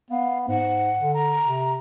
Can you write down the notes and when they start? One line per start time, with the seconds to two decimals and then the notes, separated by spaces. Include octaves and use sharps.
0.10 B3 F5
0.48 G#2 F#5
1.00 D3
1.14 A#5
1.44 C3